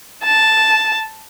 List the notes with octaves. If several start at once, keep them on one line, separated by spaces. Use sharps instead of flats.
A5